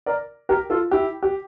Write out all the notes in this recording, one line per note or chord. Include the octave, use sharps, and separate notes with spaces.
A#4 D5
G4 A#4
F4 A4
E4 G4
G4